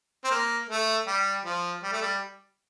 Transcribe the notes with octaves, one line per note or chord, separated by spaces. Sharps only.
C4
A#3
A3
G3
F3
G3
A3
G3